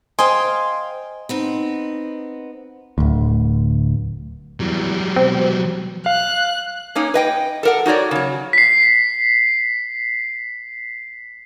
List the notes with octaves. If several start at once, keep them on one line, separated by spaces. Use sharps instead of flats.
C5 D#5 F5 G5 G#5 C6
B3 C4 D#4
D1 D2
E2 F#3 G3
B2 C4
F5 F#6
A#3 C#4 D#4
B4 D#5 G5
A4 A#4 F#5
D#4 F#4 C#5 D5
C#3 F#3
B6 C7